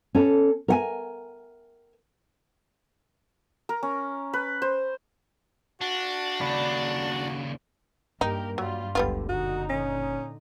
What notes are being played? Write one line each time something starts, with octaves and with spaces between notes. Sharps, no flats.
C#4 A4
A#4 F#5 G#5
A#4
C#4
B4
C5
D4 F#4
D#2 C#3 D5 B5
G2 A#3 D#4 G4 A#4
G2 F#3 G3 F4
F#1 C#2 G2 D3 G3 B3 F4
A#2 D3 D#4 F#4
C#4